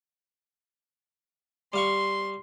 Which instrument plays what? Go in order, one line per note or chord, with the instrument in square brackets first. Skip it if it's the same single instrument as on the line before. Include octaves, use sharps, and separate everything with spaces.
[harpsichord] G3 F5 C#6 [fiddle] C6